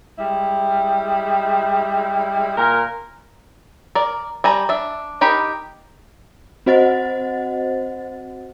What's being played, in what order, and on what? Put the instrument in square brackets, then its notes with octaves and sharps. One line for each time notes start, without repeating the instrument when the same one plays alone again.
[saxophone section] G3 G#3 E4
A#2 A#4
[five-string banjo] A#4 D5
G3 G#5 A#5
D4 E5
D#4 G4 A#4 B5
[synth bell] C4 F#4 C5 D#5 F#5 A6